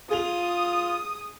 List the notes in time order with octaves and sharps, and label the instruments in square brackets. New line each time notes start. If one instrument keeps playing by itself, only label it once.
[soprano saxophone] F4 [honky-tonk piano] G#4 F7 [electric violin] D#6